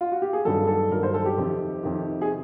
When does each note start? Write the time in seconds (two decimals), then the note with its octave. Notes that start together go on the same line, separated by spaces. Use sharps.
0.01 F4
0.12 F#4
0.22 G4
0.33 G#4
0.45 G2 D#3 F#3 A4
0.67 A4
0.91 G2 D#3 F#3 A#4
1.03 C5
1.14 A4
1.26 G4
1.38 F2 C3 D#3
1.83 F2 C3 D#3
2.21 G#4